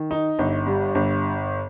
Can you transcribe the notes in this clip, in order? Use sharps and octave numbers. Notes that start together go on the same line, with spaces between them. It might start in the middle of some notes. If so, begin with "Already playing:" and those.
Already playing: D#3
D#4
G1
G2
G1